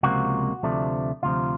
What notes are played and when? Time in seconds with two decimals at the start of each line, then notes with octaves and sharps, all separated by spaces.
0.03 C#2 C3 F3 A#3 F#4
0.63 D2 C3 F3 A3 D4
1.23 D2 C3 F3 F4